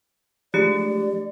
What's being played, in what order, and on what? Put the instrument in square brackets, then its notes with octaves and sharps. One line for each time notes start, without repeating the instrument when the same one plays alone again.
[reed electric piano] F3 G#3 D4 [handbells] A3 G4 C#7 [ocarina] D5